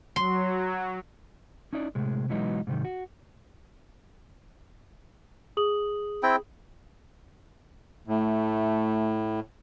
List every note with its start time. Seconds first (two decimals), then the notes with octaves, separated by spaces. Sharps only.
0.16 F#3 C6
1.73 C#4 D#4 E4 D5
1.95 A2 C3 G#3
2.29 B2 E3 F#3 G#3 B3 D#4
2.67 G#2 C3 D#3
2.85 F#4
5.57 G#4 D#6 F#7
6.23 C4 E4 G5
8.07 A2 A3